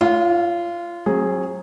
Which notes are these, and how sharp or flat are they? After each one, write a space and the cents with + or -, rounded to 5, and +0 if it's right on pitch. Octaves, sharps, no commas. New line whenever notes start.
F4 -20 C#5 +25 F5 +35
F#3 +0 C4 +40 G#4 +0